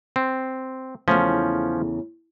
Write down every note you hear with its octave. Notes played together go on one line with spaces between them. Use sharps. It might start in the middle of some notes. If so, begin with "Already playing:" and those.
C4
E2 C#3 F3 A3 C#4